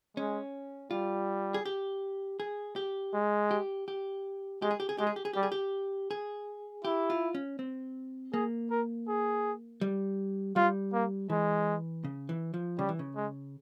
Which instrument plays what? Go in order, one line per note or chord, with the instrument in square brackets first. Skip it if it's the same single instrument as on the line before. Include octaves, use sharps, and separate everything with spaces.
[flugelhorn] G#3 [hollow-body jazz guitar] C#4
[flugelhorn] G3 [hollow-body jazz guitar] F4
[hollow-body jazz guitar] G#4
G4
G#4
G4
[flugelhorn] G#3
[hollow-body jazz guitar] G4
G4
[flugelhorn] G#3 [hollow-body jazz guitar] G4
[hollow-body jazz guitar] G#4
G4
G#4
[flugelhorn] G#3 [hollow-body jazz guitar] G4
[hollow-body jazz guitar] G#4
G4
G#4
[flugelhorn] G3 [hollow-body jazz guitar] G4
[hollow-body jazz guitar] G#4
G4
G#4
[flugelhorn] E4 [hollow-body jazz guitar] G4
[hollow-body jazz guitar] F4
C#4
C4
[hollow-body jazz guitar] A#3 [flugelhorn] G#4
[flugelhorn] A#4
G#4
[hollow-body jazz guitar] G3
[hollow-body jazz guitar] G3 [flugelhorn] F4
[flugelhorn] A#3
[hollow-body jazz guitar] E3 [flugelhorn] G#3
[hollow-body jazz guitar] C#3
E3
F3
[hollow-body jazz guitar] C#3 [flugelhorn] G3
[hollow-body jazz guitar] E3
C#3
[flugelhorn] G#3